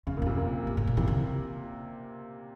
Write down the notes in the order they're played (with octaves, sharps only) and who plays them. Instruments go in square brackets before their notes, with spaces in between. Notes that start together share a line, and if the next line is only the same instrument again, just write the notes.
[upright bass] F2 [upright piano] C#3
[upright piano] A#2
[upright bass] F2 [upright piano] C3
[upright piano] A#2
[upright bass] G#2
G#2
A#2
[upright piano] C3 [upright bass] E3
[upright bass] C#3